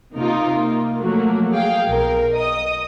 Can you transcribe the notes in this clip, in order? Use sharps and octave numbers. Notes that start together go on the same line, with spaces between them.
C3 A#3 D#4 F4 A#4
A#3
F3 F#3 A3 A#3 F#4
G#4 F5 G5
B1 A#4
D#5 D#6